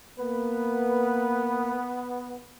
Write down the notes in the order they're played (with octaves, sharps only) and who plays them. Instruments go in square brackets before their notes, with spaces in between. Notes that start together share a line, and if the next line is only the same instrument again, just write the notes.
[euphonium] A#3 [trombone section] B3 [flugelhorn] B4